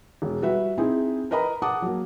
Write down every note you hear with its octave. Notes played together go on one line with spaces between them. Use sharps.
E1
G3 F#4 B4 E5
C4 D#4 E4 G#4
A#4 B4 D#5 A#5 B5
F#5 A5 D6 D#6
F#3 A#3